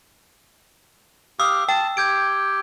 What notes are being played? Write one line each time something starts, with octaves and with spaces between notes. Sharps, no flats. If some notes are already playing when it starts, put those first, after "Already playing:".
G4 F5 D#6 E6
G5 A5
G4 G6 G#6 D7